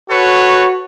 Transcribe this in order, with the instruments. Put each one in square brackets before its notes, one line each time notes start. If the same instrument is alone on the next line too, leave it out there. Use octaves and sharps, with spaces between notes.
[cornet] F#4 [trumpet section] A4 B4 C#5